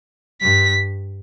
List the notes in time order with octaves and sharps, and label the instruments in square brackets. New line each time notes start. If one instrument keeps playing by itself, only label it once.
[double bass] G2 [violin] B6